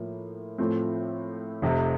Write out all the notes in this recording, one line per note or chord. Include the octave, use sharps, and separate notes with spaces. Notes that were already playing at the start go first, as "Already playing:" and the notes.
Already playing: A2 F3 A#3
A2 F3 A3 C4
F1 F2 C3